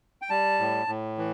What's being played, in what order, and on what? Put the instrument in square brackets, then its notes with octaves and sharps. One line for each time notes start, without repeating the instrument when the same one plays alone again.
[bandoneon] G5
G3 A5
A2
A2
E3